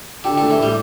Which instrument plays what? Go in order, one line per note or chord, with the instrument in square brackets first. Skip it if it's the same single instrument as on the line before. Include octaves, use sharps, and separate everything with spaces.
[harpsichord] D3 [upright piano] G4
[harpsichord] D3 [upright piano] A3
[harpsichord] E3
[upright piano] A2 [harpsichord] G3